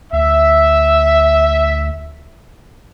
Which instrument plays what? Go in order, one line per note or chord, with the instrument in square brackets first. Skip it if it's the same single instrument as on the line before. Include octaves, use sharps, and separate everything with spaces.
[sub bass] D2 [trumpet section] E5